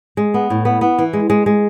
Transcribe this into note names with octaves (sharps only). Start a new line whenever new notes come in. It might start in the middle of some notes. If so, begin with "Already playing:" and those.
G#3
B3
A2
B3
B3
E3
G#3
G#3
G#3